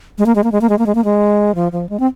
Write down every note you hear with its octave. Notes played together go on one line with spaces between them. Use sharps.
G#3
A#3
G#3
A#3
G#3
A#3
G#3
A#3
G#3
A#3
G#3
F3
F3
G#3
C4